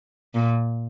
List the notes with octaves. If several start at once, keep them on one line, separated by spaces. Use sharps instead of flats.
A#2